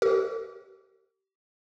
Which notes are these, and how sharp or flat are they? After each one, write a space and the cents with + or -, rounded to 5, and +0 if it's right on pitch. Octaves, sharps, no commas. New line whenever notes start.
G4 -30 A#4 -45